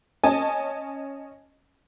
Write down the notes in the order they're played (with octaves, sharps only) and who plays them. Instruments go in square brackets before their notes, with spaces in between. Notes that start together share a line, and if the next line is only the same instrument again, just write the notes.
[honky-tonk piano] C#4 D#5 G#5 A5